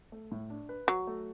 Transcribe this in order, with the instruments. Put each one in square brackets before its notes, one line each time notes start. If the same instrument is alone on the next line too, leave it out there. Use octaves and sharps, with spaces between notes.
[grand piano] A3
A2
D4
B4
[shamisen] F#3 [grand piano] F#4
[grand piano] A3